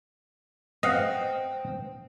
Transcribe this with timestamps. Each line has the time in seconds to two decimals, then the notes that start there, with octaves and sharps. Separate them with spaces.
0.83 C4 D#5 F5 F#5